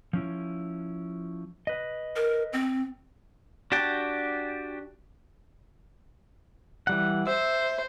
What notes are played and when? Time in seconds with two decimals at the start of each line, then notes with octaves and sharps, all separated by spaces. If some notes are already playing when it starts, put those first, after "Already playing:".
0.13 F3 C#4 E4
1.67 B4 D#5
2.16 A#4
2.53 C4
3.72 D4 F#4 G4 G5 A5
6.87 E3 G3 F#5
7.27 C5 E5